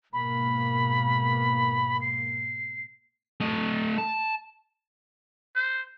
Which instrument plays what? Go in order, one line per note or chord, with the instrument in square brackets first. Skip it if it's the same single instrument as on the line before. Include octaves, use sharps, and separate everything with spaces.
[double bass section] G#2 B2 A#3 [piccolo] B5
[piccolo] C7
[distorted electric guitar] A3 D#5
A5
[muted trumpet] C5